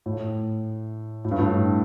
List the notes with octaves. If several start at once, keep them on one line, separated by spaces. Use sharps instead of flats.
A2
A2
G2
A2